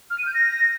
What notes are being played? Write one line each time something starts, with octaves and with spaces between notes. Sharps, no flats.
F6
D#7
G6
A#6